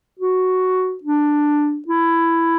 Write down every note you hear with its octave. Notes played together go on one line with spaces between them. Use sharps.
F#4
D4
E4